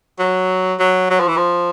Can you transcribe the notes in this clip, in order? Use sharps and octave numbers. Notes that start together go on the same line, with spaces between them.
F#3
F#3
F#3
F3
E3
F3